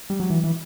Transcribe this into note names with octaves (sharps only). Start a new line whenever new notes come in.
G3
F#3
E3
E3